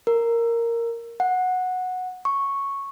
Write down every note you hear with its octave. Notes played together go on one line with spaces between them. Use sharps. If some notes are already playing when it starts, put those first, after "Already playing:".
A#4
F#5
C#6